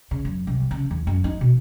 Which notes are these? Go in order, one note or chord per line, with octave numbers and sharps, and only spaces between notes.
C#3
F#2
C2
C#3
E2
F#2
D#4
B2